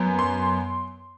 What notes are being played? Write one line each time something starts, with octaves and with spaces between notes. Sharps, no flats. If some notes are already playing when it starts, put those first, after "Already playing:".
Already playing: F#2 B3
C6